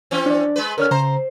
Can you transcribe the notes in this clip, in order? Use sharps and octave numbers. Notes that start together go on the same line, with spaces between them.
E3 C4 C#4
D4 D5
G#3 B4
C#3 A#4 C#5 F6
C#3 C5 A#5